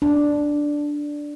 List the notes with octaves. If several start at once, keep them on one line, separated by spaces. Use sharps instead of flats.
D4